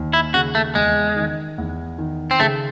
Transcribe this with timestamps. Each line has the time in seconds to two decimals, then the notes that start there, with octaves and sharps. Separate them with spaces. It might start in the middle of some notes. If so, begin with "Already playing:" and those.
Already playing: D#2
0.13 E4
0.34 C#3 F#4
0.55 A3
0.75 E2 G#3
1.16 D#3
1.58 E2
1.98 D#3
2.31 C4
2.39 C#3 A3